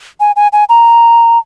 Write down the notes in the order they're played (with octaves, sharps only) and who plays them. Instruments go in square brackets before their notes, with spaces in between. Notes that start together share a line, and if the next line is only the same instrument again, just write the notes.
[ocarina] G#5
G#5
G#5
A#5